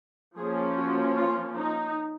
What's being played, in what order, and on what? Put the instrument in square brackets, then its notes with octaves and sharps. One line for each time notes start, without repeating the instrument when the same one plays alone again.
[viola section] F3 A#3 C#4 G#4
F#4
F4
D#4